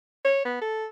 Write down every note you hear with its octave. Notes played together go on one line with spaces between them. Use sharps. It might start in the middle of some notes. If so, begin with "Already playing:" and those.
C#5
B3
A4